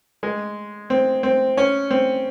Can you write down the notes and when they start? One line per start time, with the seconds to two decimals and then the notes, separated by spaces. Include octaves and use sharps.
0.23 G#3
0.90 C4
1.23 C4
1.57 C#4
1.91 C4